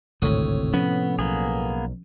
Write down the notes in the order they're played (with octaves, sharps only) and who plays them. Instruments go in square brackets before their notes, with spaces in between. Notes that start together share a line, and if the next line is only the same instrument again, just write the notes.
[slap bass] G#1 D2 [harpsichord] A2 C#5 D#6 [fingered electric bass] C3
[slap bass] F3 C#4 [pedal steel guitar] B3
[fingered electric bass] B1 [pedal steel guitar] A#3 B3 G#4